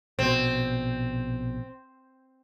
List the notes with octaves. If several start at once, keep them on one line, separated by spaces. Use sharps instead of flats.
A#1 B2 C4